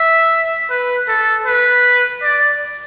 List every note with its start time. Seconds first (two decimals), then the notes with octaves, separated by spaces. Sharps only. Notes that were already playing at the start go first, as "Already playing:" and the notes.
Already playing: E5
0.70 B4
1.08 A4
1.46 B4
2.23 D5